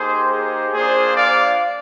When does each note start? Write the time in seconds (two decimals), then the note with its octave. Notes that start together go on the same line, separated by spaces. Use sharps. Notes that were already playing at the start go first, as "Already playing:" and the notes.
Already playing: A#3 D#4 G4 G#4 C5
0.31 G#4 C5
0.72 A#3 D4 F4 G#4 C5
1.14 D5 F5